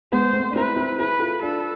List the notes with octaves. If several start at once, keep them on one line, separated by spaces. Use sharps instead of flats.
G#3 B3 C5
A3 C4
D4
C4 E4 B4
C4 E4
E4 G#4 B4
F4 A4
D4 F4 A4